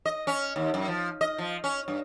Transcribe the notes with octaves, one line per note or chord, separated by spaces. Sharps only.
D#5
C#4
D#2
F#2
F3
D#5
F3
C#4
G2